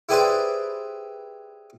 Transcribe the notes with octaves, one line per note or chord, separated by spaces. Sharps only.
E4 G4 G#4 B4 C5 D5